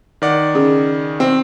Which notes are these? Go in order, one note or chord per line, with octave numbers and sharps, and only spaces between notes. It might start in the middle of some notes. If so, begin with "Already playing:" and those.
D#3 D5 F#5
C#3
C4